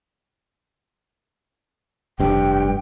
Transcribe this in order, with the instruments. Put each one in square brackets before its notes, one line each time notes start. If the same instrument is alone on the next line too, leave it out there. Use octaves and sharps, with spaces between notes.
[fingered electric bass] F1 G2 [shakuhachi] G5